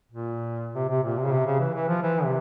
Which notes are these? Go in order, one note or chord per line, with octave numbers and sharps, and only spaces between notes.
A#2
C3
C3
A#2
C3
C#3
C3
C#3
E3
E3
F3
E3
C3